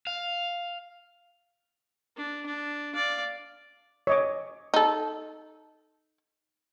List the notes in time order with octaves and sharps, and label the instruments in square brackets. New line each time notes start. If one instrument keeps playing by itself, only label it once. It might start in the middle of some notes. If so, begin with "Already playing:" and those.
[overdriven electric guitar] F5
[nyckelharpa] D4
D4
D5 F5
[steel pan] C#5 D#5 D6
[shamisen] D#4 A4